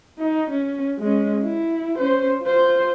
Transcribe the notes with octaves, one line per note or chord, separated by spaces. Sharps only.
D#4
C#4
G#3 C#4
E4
C#4 C5
F4 C5